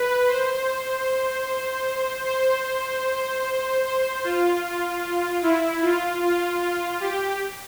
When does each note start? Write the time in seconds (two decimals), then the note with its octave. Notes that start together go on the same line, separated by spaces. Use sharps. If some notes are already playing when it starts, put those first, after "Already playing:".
Already playing: B4
0.27 C5
2.25 C5
3.84 C5
4.24 F4
5.42 E4
5.82 F4
6.22 F4
6.61 F4
7.00 G4